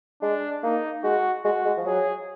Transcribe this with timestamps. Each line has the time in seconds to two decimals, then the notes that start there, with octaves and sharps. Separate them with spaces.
0.22 G#3 D4
0.63 A#3 D#4
1.03 G#3 F#4
1.44 G#3 F#4
1.65 G#3
1.78 F3
1.86 F#3 G#4